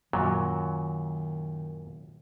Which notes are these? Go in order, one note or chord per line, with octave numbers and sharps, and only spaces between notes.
F#2 A#2 D#3 F#3